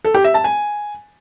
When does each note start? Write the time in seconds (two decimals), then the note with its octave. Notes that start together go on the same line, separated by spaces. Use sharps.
0.05 A4
0.14 G4
0.24 E5
0.34 A5
0.44 G#5